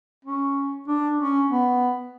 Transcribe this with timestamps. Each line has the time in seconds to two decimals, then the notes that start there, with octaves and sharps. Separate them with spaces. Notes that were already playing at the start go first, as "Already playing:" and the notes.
0.25 C#4
0.88 D4
1.19 C#4
1.50 B3